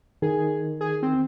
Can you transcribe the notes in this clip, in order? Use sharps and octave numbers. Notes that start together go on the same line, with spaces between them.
D#3 G#4
G#4
C4